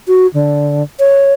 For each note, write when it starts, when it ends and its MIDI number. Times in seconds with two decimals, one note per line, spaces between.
0.08 0.27 66
0.34 0.83 50
1.00 1.33 73